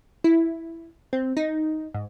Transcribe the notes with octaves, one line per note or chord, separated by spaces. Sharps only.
E4
C4
D#4
G#2